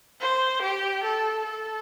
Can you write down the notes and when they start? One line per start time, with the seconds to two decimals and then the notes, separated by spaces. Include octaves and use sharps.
0.21 C5
0.62 G4
1.03 A4
1.45 A4